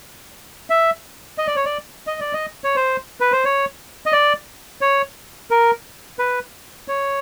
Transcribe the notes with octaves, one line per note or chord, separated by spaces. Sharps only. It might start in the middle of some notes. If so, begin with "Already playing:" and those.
E5
D#5
D5
C#5
D5
D#5
D5
D#5
C#5
C5
B4
C5
C#5
D#5
D5
C#5
A#4
B4
C#5